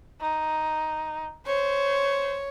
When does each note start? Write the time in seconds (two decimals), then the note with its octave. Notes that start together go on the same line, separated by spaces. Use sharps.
0.21 D#4
1.46 C5 C#5